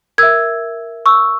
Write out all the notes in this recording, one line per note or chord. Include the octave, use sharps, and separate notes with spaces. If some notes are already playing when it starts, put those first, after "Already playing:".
A#4 E5 E6 G#6
C#6 E6